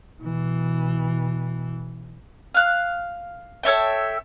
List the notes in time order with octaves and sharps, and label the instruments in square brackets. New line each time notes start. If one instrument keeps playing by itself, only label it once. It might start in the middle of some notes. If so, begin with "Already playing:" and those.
[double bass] B2 E3
[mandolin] F5 F#6
A4 C#5 E5 G5